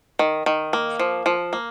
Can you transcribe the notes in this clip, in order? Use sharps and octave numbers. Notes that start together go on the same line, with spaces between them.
D#3
D#3
A#3
F3
F3
A#3